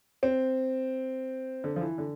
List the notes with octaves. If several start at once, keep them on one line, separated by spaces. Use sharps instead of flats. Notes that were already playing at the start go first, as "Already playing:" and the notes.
C4
D3
F3
E3
D3